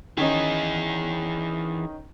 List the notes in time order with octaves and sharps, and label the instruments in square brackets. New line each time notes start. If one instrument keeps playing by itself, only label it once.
[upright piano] D#3 C#4 D#4 [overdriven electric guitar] E3 G#4